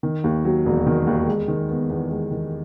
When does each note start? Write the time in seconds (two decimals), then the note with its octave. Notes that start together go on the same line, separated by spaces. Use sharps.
0.03 D#3
0.24 D#2
0.45 F#3
0.66 E1
0.86 D#3
1.07 D#2
1.28 G#3
1.48 D#3
1.70 B3
1.90 E2
2.10 G#3
2.31 D#3